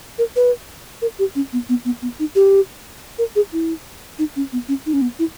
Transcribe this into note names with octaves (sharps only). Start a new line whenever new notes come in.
A#4
B4
A#4
G4
C#4
B3
B3
B3
B3
D#4
G4
A#4
G#4
E4
D#4
C#4
B3
C#4
D#4
C#4
B3
E4